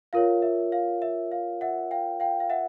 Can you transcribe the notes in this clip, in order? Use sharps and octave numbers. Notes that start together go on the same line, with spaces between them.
F4 A#4 C#5 F5
E5
F5
E5
F5
E5 F#5
F5 G5
F5 G5
F5
E5 F#5